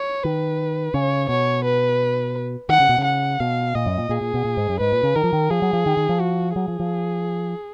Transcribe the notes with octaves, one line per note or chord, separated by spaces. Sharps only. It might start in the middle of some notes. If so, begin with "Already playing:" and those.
Already playing: C#5
D#3 B4
C#3 C#5
B2 C#5
B4
D#3 F#5
C#3
B2
C#3
F#5
B2 F5
A#2 D#5
F#2
A#2
A#2 G#4
A#2
B2
A#2
G#2
F#2
G#2 B4
A#2
C#3
D#3 A#4
F3
D#3
F3 G#4
F#3
F3
D#3
D#3
F3
F#4
F#3 G#4
F3
F3